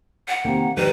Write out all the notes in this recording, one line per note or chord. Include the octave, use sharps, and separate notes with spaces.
F#5
C3 D#3 A#3
G#2 D#3 G3 B4